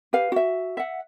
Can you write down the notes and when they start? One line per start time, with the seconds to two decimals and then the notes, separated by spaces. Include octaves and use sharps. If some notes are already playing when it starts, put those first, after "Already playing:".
0.13 G4 B4 F5
0.32 F#4 E5
0.77 E5 F#5